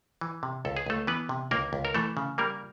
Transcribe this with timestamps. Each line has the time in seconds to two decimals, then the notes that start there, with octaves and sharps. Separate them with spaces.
0.21 E3
0.43 C3
0.65 C#2 A4
0.77 G#4
0.86 C#2 A3 A4
1.07 E3 B3 B4
1.29 C3
1.51 C#2 A#3 A#4
1.73 C#2
1.85 A#4
1.94 E3 A3 A4
2.17 C#3
2.38 G3 A#3 A#4